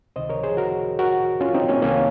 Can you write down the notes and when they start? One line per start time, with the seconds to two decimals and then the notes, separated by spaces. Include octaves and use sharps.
0.16 C#2 C3 D#3 C5 D#5
0.29 A#4 C#5
0.44 G#4 C5
0.57 F#4 A#4
0.99 F#4 A#4
1.41 C#4 F4
1.54 C4 D#4
1.68 A#3 C#4
1.82 C2 C3 D#3 A#3 C#4